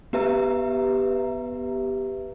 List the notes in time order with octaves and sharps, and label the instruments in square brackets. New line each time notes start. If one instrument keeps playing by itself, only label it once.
[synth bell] B3 G4 B4 E5 A#5